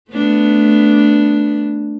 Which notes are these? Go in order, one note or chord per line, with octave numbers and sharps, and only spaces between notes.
A3 B3 D4